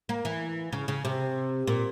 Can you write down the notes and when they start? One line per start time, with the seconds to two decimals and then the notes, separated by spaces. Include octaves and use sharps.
0.09 A#3
0.25 E3
0.73 C#3
0.88 C#3
1.05 C3
1.67 A#2